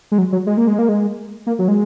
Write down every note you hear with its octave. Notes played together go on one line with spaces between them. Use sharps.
G#3
F#3
F#3
G#3
A#3
G#3
A#3
G#3
A#3
F#3
G#3